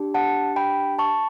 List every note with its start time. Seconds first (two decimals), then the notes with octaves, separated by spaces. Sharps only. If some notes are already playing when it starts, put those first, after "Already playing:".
Already playing: D4 G4
0.14 F#5 A5
0.56 G5 B5
0.99 A5 C#6